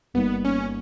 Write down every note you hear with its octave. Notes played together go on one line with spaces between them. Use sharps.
G1 G2 G3 A#3 B3 D#4
C#4